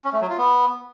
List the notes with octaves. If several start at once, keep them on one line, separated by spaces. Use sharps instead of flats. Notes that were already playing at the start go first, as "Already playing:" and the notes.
C#4
A3
F#3
F4
B3